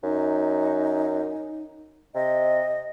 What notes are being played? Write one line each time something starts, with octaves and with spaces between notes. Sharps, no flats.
F#2 D#4
C3 D#5